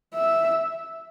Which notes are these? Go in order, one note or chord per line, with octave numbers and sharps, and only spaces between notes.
E5